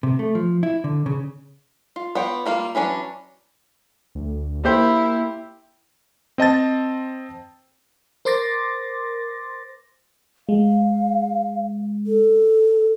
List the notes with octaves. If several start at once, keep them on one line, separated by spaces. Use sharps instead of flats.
C3
A3
F3
E4
D3
C#3
F4
B3 F4 C#5 G5
G3 A#3 F4 F5
E3 F#3 C#4 D4
D2
A#3 E4 G4 C5
C4 D#5 A5 A6
A#4 C5 C6 D6 A6 A#6
G#3 F5
A4